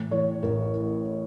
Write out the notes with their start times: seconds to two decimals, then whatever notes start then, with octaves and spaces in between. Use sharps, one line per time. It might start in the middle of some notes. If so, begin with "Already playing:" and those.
Already playing: A2 E3
0.11 E3 C#5
0.43 A1 A#4